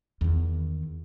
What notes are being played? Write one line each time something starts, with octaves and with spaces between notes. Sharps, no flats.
E2 D#3